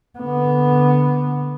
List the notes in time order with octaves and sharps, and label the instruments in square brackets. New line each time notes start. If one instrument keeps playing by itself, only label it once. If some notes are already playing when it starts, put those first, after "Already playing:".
[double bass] D3 B3